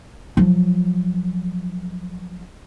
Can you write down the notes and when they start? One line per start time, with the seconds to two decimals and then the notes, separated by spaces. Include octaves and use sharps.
0.37 F3 F#3